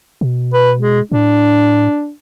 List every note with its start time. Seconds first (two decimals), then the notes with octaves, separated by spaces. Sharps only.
0.21 B2
0.54 B4
0.79 G#3
1.12 A2 D4